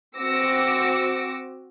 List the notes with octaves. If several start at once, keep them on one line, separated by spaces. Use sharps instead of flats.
C4 F#4 D6 E6 A#6 C#7